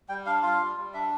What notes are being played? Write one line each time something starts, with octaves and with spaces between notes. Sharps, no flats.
G3 G5
D4 F5
F4 F5
G3
G3
D4 E5